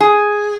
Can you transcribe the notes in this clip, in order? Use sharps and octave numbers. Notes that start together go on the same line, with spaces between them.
G#4